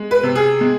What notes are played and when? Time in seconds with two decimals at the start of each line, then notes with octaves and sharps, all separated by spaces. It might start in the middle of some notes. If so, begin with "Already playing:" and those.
Already playing: G#3
0.11 B4
0.23 C3
0.35 G#4
0.61 G#3